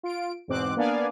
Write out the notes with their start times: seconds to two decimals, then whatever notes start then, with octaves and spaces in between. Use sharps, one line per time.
0.03 F4 D7
0.48 E2 G#2 B2 C4 D6 F#6
0.76 A#3 B3 D4 D5 F5 G#5